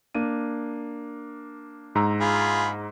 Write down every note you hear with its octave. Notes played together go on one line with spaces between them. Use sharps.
A#3 D4 D#7
G#2 A#5 E6
F4 G#4 B5